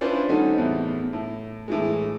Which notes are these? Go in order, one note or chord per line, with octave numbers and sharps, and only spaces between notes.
C#4 D4 E4 F4 B4 C5
D#3 G3 A3 C#4 D#4 F#4
E2 A2
A2
A2 E3 G#3